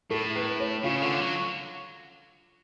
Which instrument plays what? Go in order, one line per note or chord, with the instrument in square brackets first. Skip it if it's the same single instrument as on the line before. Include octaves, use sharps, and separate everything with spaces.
[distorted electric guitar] A2 [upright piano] A4
[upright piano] B4
C#5
[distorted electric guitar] C#3 [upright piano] F4
[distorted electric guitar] D3
F#3